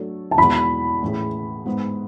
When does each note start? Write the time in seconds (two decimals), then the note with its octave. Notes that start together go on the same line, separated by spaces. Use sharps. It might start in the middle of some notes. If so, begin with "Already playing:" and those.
Already playing: F#3 A3 D4 A4 C#5
0.31 A5
0.38 E2 B2 G#3 B3 B5
1.03 A2 E3 A3 C#4 G#4
1.65 G#2 G#3 B3